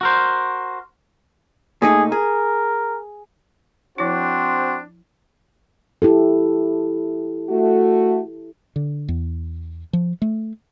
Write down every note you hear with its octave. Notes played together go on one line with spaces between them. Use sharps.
F#4 A#4 C5
A#2 A3 D#4 G#4
G#4 A#4
F3 C4 D4 E4 F#4 C5
E4 G4 A4
A3 F#4
D3
E2
F3
A3